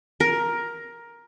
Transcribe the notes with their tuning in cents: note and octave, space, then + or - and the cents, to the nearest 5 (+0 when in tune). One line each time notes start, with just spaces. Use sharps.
A#4 +10